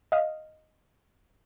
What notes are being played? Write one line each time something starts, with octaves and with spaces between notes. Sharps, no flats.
D#5 F5